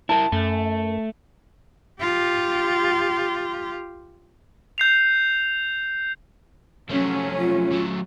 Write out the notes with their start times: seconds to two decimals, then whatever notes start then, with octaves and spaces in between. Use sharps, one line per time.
0.09 E4 A#4 A5
0.32 F#2 A3
2.01 F4 G4
4.78 G6 C7 F7
6.90 F3 F#3 A3 C#4
7.38 F4
7.71 F#3 A3